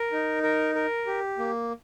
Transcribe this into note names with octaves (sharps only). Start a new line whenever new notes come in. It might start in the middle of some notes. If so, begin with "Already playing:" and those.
Already playing: A#4
D#4
A#4
A#4
G4
A#3